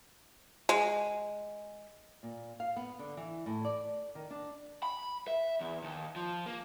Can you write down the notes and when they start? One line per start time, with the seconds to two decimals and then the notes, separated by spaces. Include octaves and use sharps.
0.69 G#3
2.23 A#2
2.60 F5
2.76 B3
2.99 D3
3.17 E3
3.46 A2
3.65 D5
4.15 D#3
4.30 D4
4.83 B5
5.28 E5
5.61 E2
5.84 D#2
6.16 F3
6.46 A#3